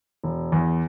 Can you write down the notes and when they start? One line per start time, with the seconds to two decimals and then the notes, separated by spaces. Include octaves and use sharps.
0.24 E1
0.52 E2